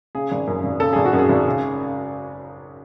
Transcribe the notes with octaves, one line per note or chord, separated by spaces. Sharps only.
C#3 G#4
G#1
F#2
G#1
C#3 A4
G#1 G#4
F#4
F#2
G#4
G#1
C#3